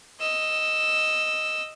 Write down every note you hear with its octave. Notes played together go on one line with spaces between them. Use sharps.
D#5 E6